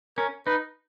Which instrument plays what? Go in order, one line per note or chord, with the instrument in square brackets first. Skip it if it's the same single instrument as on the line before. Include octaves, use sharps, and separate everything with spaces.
[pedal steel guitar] C#4 [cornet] A#4
[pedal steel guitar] D#4 [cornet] B4